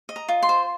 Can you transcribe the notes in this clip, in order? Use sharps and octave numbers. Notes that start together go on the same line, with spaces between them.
D#5
A#5
F4
C6
C5